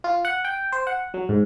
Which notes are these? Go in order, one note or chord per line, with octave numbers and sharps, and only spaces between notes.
F4
F#5
G5
C5
F#5
F#3
G#2